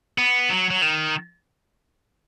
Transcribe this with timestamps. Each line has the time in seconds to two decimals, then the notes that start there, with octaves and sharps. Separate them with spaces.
0.18 B3
0.50 F#3
0.70 F#3
0.82 D#3